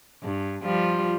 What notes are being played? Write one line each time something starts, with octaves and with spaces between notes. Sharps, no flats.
G2
F3 G3 F4